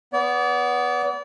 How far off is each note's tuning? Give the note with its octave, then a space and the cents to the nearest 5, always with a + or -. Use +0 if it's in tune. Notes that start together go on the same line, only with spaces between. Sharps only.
B3 +0 D5 -35